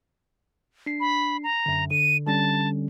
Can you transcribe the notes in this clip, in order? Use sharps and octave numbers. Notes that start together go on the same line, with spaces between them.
D4 C7
B5
A#5
F#2 D3
D3 D#7
D3 G3 C#4 A5